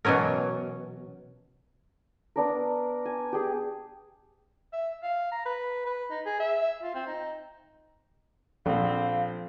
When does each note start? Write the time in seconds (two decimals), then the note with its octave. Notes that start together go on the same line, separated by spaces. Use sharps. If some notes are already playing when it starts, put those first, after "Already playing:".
0.05 B2 E3 F#3 C#4 A#4
2.36 B3 D4 A#4
3.05 G#5
3.32 G4 G#4
4.73 E5
5.03 F5
5.32 A#5
5.46 B4
5.86 B4
6.11 D#4
6.26 G#4
6.40 E5
6.83 F4
6.95 C4
7.07 D#4
8.66 A#1 F3 C4 A4 F5